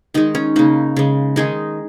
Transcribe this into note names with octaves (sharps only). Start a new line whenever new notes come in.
D#3 G#3 D#4
C#4
C#3 A#3 D#4
C#3 G#3
D#3 G#3 D#4 G#4